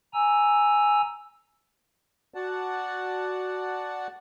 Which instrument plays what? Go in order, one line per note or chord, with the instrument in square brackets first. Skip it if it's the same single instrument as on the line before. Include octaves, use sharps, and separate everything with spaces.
[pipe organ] G#5 A#5 E6
[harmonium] F#4 D5 F#5 A5